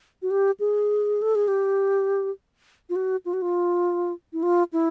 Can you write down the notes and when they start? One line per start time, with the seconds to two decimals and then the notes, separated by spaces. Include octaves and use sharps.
0.22 F#4
0.31 G4
0.60 G#4
1.22 A4
1.35 G#4
1.48 G4
2.90 F4
2.96 F#4
3.26 F4
3.33 F#4
3.42 F4
4.33 E4
4.43 F4
4.73 E4